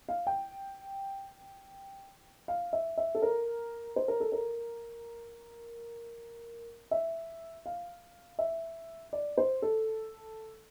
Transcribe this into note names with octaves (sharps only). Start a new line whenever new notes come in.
F5
G5
F5
E5
E5
A4
A#4
C5
A#4
A4
A#4
E5
F5
E5
D5
C5
A4